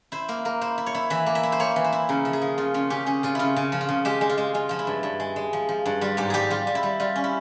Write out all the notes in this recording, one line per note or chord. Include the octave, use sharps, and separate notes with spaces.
E4 C5
A#3 A#4
A#3 A#4
E4 C5
E4
C#5
E4
E3 E5
A#3
E5
E4
C5
A#3 C#5
E3
C5
E4
C#3 A#4
F3
G#4
F3
C#3 F4
C#3 F4
C#4 G4
C#4 G#4
C#3 F4
C#3 E4 F4
C#3
F3
F4
C#3
G#3 G4
G#3
F4
G#3
G#3 F4
F3 F4
E4
G2
G2
G#3
G#3
F3
F3
G2
G3 F4
G#2 G4
G3 G4 G#4
G3 F4
G3
E4
G3
G3 F4
C#4
E4